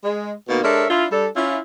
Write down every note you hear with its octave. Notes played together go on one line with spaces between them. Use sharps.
G#3
B2 D#3 A#3
G#3 D4 A4 A#4 C#5 E5
D4 E4 F4
G3 D4 A4
C#4 E4 F4